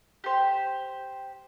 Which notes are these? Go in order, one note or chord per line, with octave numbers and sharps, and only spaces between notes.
G4 C5